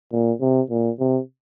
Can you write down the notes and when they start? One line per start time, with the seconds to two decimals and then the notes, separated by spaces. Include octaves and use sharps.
0.12 A#2
0.41 C3
0.70 A#2
0.99 C3